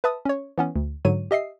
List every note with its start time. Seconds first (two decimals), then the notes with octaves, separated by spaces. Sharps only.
0.04 B4 E5 A5 D#6
0.25 C#4 C#5
0.58 E3 B3 C#4
0.76 D2
1.05 G#2 D3 F#3 C#5 D#7
1.31 G4 D#5 E5 C7